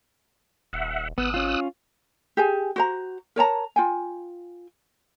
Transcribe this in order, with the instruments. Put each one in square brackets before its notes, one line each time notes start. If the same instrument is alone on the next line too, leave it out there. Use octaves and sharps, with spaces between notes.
[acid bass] D#1 [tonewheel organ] E5 F#5
[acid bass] G#1 [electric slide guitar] B3 [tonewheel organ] D#6 E6 F#6
[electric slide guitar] C#4 F4
[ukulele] G4 G#4 G#5
F#4 C5 A#5
A#4 C#5 A5 A#5
F4 G5 G#5